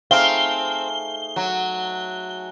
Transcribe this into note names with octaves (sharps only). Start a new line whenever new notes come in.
A3 C4 D#4 G#4 F5 G7
F#3